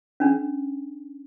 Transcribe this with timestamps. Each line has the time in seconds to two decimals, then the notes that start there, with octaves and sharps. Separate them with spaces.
0.20 C#4 D4